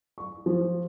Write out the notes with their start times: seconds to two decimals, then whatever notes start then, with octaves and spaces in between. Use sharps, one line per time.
0.18 C#6
0.46 F3